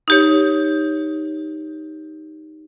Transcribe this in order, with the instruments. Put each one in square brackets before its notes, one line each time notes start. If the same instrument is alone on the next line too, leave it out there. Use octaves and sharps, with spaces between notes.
[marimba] D#4 G4 C#5